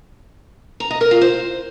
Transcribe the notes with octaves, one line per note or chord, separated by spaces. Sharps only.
A#5
D#5
A#4
F4
C5